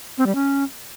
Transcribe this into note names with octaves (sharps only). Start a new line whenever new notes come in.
C4
G3
C#4